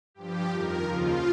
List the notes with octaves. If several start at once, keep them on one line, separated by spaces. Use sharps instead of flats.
G2 F3 G4
F2 D#3 A#4
D#2 C#3 F3 F4